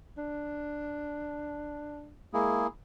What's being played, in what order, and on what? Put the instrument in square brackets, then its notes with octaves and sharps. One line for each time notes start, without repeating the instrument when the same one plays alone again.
[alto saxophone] D4
[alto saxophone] G#3 [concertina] A#3 E4 G#4